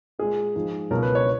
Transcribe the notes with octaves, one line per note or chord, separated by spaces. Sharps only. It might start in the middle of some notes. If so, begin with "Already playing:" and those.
A#2 G#3 G#4
G#2 F3 G#3
C#2 B2 F#3 A#4
B4
C#5